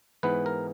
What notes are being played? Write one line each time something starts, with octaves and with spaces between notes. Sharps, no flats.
G#2 E3 B3 B4
A#4